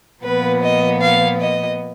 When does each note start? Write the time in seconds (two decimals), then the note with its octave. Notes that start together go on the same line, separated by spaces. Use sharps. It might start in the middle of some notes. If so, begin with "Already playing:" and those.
0.23 A#2 F3 B3 B4
0.61 D#5
1.00 F5
1.39 D#5